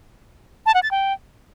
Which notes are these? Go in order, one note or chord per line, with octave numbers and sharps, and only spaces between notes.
A5
F#5
A6
G5